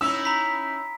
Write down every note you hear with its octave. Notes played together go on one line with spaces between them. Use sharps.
C#4 D#4 E4 E6
A#5 B5 B6